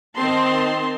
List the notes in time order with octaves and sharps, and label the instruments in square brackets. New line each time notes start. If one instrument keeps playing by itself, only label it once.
[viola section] D#3 C4 D#5 A5 C6